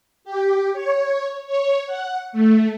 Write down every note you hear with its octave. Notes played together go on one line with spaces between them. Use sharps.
G4
C#5
C#5
F#5
A3